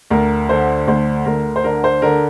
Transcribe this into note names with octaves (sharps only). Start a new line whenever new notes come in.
D2 A#4
D3 C5
D2 C5
D2 A#4
C5
D3 A#4
C5
D3 A#4